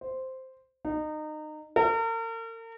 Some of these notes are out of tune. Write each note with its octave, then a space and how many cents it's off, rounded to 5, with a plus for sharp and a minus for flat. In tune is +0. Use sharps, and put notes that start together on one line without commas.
C5 -5
D#4 -25
A#4 -40